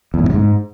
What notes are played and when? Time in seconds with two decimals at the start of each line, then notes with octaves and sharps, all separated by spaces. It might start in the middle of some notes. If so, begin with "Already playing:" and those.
0.14 E2
0.19 A2
0.24 G2
0.29 C3
0.34 G#2